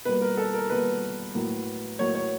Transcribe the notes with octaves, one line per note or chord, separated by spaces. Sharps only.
B2 G3 A#3 B4
A#4
A4
A#4
B2 G3 A#3 B4
A2 F#3 A#3
A2 F#3 A#3 C#5
C#5